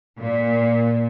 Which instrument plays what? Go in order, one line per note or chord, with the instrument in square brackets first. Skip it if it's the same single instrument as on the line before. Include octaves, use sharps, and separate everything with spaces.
[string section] A#2